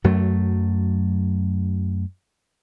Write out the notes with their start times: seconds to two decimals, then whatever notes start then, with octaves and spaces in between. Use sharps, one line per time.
0.04 F#2 F#3 A3